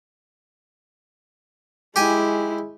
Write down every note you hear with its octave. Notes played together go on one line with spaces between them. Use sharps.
G#3 E4 G4 G#5